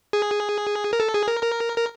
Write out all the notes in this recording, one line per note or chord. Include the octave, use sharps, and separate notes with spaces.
G#4
A#4
A4
G#4
A#4
A#4
A#4